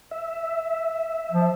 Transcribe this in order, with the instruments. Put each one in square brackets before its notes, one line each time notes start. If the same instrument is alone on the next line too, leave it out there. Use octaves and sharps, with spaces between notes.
[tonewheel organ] E5
[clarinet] F3